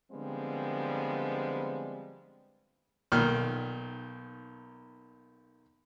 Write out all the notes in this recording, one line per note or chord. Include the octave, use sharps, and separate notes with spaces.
D3 F3 G3 G#3 B3 C4
B1 A#2 D#3 F6